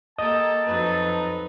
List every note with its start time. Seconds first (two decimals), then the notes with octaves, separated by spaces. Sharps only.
0.19 A#3 G4 A4 D#5 A5 D#6
0.67 F2 F#3 D#4 B4